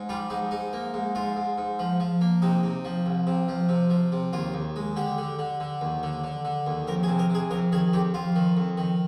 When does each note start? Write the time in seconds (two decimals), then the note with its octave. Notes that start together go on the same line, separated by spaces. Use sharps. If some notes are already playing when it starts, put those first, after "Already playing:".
Already playing: G#2
0.09 G3 F4
0.30 G#2 D#4
0.51 G#2 D#4
0.73 A#3
0.94 G#2
1.15 G#2 F4
1.36 G#2
1.58 G#2
1.79 F3
2.00 F3
2.21 A#3
2.42 C3 D#4
2.63 C3
2.85 F3
3.06 C2
3.27 C3
3.48 F3
3.69 C3
3.90 F3
4.12 C3
4.33 D#2 F4
4.54 D#2
4.76 G#3
4.96 D3 G4
5.18 D3
5.39 D3
5.60 D3
5.81 D#2
6.03 D3
6.24 D3
6.45 D3
6.67 D#2
6.87 F2 A#4
7.03 G#4
7.08 C3
7.19 A#4
7.30 C3 G#4
7.51 F2 A#4
7.72 D#3 G#4
7.93 F2 G4
8.14 F2 F4
8.36 D#3
8.57 F2
8.77 D#3